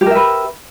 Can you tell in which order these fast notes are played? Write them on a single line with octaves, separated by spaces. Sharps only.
G4 A#4 E5 B4